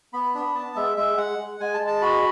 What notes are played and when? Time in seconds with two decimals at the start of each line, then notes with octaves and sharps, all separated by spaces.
0.13 B3 B5
0.34 D4 B5
0.54 B3 A5
0.76 G#3 E5
0.97 G#3 E5
1.18 G#3 F#5
1.39 G#3
1.60 G#3 G#5
1.74 A5
1.81 G#3
1.87 A5
2.02 F#4 B5